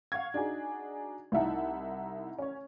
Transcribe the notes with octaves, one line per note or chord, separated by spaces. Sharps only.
F5 F#5 C#6 G#6
D4 D#4 F#4 G#4
C2 D#4 E4 E5 F#5 A5
C#4 C#5